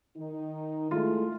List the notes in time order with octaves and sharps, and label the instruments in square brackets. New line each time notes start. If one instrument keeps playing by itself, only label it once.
[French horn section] D#3 D#4
[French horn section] G#3 A3 E4 [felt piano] F4